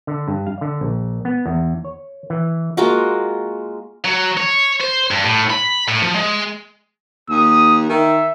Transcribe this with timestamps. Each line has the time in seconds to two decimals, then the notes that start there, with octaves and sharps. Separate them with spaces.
0.07 D3
0.28 G2
0.47 F5
0.61 D3
0.81 A#1
1.25 B3
1.46 E2
1.85 C#5
2.30 E3
2.77 G#3 A#3 F4 F#4
4.04 F#3
4.37 C#5
4.81 C5
5.11 G2
5.24 A2
5.50 B5
5.88 A2
6.03 F3
6.15 G#3
7.30 D#2 D#6
7.89 D#3 E5